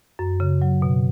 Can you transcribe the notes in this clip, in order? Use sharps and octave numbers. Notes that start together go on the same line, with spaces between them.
F#2
C#3
F#3
B2